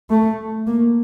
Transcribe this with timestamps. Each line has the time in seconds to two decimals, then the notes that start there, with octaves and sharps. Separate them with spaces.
0.10 A3
0.67 A#3